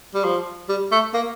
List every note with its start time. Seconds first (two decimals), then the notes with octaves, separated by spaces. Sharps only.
0.14 G3
0.24 F3
0.69 G3
0.92 A3
1.14 A#3